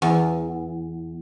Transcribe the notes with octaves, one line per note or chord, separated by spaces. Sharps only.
E2